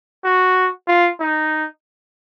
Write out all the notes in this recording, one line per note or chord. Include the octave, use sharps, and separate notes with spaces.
F#4
F4
D#4